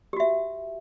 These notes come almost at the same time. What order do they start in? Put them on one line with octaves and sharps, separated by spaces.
G4 F#4 E5